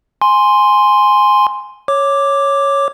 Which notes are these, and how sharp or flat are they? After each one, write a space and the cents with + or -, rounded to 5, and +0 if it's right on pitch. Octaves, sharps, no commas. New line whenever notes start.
G#5 +0 C6 +0
C#5 +0 D6 +0